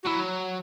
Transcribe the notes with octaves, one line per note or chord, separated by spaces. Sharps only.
F#4
F#3 E4